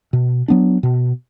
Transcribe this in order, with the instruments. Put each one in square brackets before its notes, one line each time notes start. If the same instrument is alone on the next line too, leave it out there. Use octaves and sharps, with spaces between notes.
[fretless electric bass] B2
F#3 B3 D4
B2